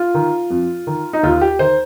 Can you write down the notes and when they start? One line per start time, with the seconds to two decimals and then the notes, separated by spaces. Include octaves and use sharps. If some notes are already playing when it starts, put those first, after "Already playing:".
Already playing: F4
0.14 D#3
0.50 F2
0.87 D#3
1.13 D#4
1.23 D#2 F4
1.41 G4
1.59 D#3 C5